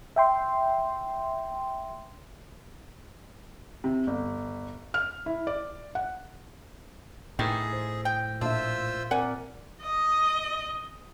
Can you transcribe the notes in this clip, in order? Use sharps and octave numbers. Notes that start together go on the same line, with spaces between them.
E5 G5 C6
C3
G1
F6
E4
D5
F#5
A2 D#3 E3 G#4
C5
G5
A#2 D4 F4 C5 E5 E6
C4 A#4 D5 F#5 G#5
D#5